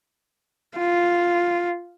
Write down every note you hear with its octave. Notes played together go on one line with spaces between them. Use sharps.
F4